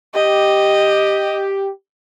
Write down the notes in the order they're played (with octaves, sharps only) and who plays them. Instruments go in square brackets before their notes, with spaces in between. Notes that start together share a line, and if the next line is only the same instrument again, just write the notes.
[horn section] G4 [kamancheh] D#5